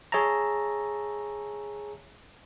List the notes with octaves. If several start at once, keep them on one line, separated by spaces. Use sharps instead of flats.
G#4 C#5 E5 A5 A#5